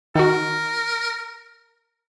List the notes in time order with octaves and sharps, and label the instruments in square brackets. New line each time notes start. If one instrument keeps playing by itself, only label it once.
[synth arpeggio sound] D#3 D#4 F#4 [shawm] A#4